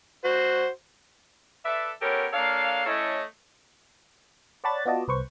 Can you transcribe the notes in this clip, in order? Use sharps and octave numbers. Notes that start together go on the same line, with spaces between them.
F#4 C5
A4 B4 D5 E5
B3 C#4 G4 A4 A#4 C#5
A#3 D4 A4 C#5 F5
A3 C#4 E4 A4 C#5 D#5
C#5 D5 F#5 A5 B5 A6
B3 F4 F#4 D5 D#5 A5
C2 B4 C5 C#6